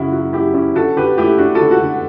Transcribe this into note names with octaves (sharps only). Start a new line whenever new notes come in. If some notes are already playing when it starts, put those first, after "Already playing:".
Already playing: F#2 C#3 C#4 E4 F#4
F#3 F#4
F#2 E4 G4
C#4 E4 G4
D3 F#4 A4
D3 G4 B4
A3 E4 G4
D4 F#4
F#4 A4
D3
F#4
D3